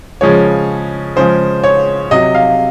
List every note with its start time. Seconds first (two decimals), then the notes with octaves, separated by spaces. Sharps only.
0.21 C#3 F3 G#3 C#5
1.16 C#3 F3 G#3 C5
1.64 C#5
2.11 C3 F#3 D#5
2.34 F5